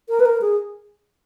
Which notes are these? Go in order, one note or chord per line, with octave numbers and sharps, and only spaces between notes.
A#4
B4
A#4
G#4